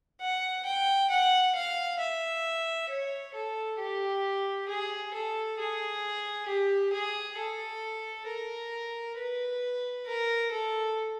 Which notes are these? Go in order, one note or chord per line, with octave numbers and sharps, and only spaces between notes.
F#5
G5
F#5
F5
E5
C#5
A4
G4
G#4
A4
G#4
G4
G#4
A4
A#4
B4
A#4
A4